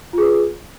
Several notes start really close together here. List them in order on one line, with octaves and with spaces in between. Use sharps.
F4 G#4 B4